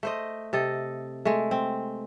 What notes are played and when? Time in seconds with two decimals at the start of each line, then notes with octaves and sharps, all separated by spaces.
0.03 A3 C5 D#5
0.53 C3 A4 D#5
1.25 G#3 A3
1.51 C4